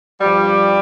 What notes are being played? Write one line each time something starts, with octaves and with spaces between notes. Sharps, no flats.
G2 F3 G3